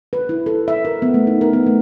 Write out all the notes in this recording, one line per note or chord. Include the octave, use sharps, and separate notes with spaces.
B4
E4
A4
E5
A#4
B3
A3
D#4
A#4
B3
A3